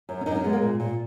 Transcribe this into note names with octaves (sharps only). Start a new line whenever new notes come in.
F#2
C#4
F#2 D#4
C#4
G#3 B3
A#3
A#2
A#2